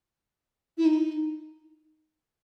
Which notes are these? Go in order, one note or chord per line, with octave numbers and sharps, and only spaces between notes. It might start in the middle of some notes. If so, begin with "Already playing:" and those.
E4
D#4